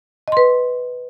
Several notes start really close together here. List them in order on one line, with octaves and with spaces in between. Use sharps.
D#5 C6 B4